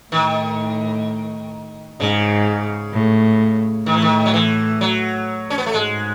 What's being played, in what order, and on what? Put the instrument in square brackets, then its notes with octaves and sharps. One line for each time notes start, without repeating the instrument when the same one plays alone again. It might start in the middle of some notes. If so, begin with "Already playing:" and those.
[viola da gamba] A2 [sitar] D#3
[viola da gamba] G#2 [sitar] C#3
[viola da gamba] A2
[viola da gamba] A2 [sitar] D#3
[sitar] E3
D#3
F#3
E3
F#3
C#4
B3
A3
[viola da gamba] G#2 [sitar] G#3